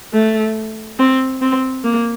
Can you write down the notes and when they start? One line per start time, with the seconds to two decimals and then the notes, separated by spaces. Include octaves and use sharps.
0.14 A3
0.99 C4
1.42 C4
1.84 A#3